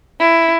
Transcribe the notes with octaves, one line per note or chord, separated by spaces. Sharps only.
E4